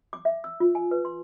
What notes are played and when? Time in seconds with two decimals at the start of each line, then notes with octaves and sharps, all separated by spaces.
0.13 D6
0.25 E5
0.44 E6
0.60 F4
0.75 G#5
0.91 B4
1.05 C6